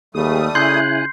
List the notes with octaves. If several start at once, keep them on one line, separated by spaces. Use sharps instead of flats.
D#2 G3 A3 G#4 D#6
C#3 E4 G#5 C6 F#6 G6 C7